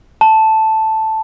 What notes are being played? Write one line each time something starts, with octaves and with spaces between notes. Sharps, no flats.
A5